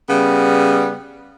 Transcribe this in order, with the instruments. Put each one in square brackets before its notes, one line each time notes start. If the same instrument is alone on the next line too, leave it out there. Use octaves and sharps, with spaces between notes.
[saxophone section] C#3 G3 B3